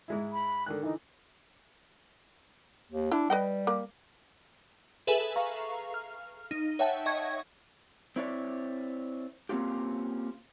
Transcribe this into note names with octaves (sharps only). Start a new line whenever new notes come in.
G#2 G#3 E4
B5
D3 D#3 F#6
D3 E3 D#4
D#2
D4 E4
G3 B4 D#5 G5
A#3
G#4 A4 B4 E5 G#5
F5 A#5 C#6
F6
D#4
C#5 E5 F#5 G5 A5
D#5 C#6 G#6
C4 E4 C#5 D5
A#3 C4 C#4 F4 G4